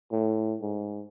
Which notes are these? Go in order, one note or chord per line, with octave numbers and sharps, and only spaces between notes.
A2
G#2